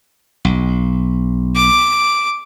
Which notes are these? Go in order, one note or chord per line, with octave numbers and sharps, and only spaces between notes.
B1
D6